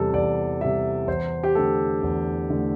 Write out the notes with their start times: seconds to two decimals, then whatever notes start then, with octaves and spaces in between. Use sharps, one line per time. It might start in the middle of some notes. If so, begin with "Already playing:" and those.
Already playing: E2 C3 G3 A4
0.13 E2 D5
0.61 C3 G3 E5
1.07 E2 C5
1.43 G4
1.55 D3 A3 A4
2.03 E2
2.50 D3 A3